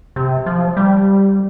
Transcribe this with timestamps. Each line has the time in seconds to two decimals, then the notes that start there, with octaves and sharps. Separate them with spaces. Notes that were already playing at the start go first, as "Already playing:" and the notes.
0.16 C3
0.46 F3
0.77 G3